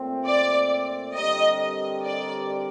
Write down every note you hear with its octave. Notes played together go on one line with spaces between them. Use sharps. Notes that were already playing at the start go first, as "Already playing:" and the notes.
Already playing: A#2 A3 C4
D5
D3 G3 C4 G4 A#4 D#5
D5